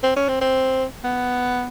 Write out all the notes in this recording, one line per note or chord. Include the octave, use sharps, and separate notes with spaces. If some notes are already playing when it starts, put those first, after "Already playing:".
C4
C#4
C4
C4
B3